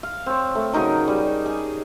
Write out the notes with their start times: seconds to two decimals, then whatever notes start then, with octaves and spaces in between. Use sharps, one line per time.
0.03 F5
0.26 C4 C#5
0.55 A3
0.73 C#3 F#3 D#4 A#4
1.08 G3
1.46 G#4